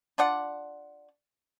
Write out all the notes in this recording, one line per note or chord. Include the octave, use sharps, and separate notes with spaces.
D4 F4 D5 F#5